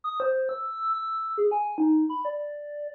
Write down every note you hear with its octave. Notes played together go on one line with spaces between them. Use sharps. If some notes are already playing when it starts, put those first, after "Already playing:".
D#6
C5
E6
E6
G#4
G#5
D#4
B5
D5